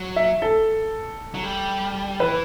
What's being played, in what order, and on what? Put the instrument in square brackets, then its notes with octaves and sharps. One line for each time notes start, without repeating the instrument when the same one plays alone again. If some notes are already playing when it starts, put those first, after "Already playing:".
Already playing: [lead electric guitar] F#3
[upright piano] E5
A4
[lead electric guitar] F#3
G3
[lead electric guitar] E3 [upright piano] B4